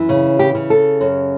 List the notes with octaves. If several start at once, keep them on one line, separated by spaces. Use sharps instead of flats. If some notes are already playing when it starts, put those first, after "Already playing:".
Already playing: F#2 E3
C#3
G4
C#3
A4
F#2